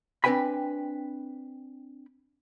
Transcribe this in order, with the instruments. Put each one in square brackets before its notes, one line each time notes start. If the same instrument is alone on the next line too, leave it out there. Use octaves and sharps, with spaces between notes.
[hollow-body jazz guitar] C4 D4 B4 G5 G#5 B5